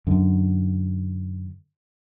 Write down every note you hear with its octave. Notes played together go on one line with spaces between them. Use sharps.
F#2 D3